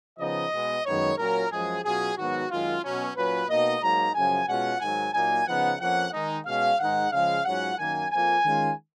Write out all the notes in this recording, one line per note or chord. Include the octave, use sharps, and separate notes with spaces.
C#3 F3 B3 D#4 D#5
B2 G#3 B3
F#2 D#3 G#3 B3 D#4 C#5
A#2 F#3 C#4 F4 A#4
F#2 F3 G#3 G#4
B2 F#3 C#4 F4 G#4
G#2 D#3 F#3 B3 F#4
F#2 D#3 G#3 F4
B2 F#3 C#4
A#2 F#3 C#4 F4 B4
B2 A#3 D#4 D#5
G#2 F#3 A#3 D#4 A#5
F#2 C#3 F3 G#5
B2 G#3 C#4 F4 F#5
G#2 D#3 F#3 G#5
A#2 F#3 A#3 D#4 G#5
C#3 F3 B3 D#4 F#5
F2 F3 A#3 C#4 F#5
D#3 G#3 D#4
B2 G#3 C#4 F5
G#2 D#3 G#3 D#4 F#5
C#3 F3 G#3 F5
G#2 F#3 C#4 F4 F#5
F#2 D#3 A#3 G#5
F2 F3 A#3 F4 G#5
D#3 G#3 C#4 F4